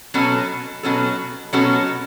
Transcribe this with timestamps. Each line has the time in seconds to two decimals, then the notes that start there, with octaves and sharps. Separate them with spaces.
0.14 B2 F#3 C#4 F#4 A4
0.83 B2 F#3 C#4 F#4 A4
1.53 B2 F#3 C#4 F#4 A4